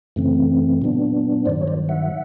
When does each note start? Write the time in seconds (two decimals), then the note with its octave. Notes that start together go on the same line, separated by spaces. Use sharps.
0.16 F#2 C#3 E3 A3 C4
0.82 A#2 F#3 B3 D4
1.46 G2 D#3 F#3 C5 D5
1.61 C#5
1.67 C5 D5
1.89 E5 F#5